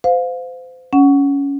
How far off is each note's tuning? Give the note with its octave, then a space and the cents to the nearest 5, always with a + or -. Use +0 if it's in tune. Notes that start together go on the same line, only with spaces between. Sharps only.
C5 -30 F5 +20
C#4 +15 F#5 +0